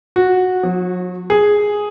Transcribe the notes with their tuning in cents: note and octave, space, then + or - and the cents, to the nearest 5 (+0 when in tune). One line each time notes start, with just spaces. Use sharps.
F#4 -10
F#3 -40
G#4 +0